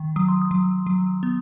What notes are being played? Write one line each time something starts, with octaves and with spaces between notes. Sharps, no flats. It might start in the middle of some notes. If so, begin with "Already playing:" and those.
Already playing: D#3
F#3 D#6
C6
D#6
F#3
F#3
B3